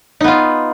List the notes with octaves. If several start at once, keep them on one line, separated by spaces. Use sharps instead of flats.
B3 D#4 F4